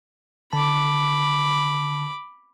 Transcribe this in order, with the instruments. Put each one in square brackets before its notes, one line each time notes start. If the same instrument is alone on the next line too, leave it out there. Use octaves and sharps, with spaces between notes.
[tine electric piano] D3 A5 [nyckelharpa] B5 D6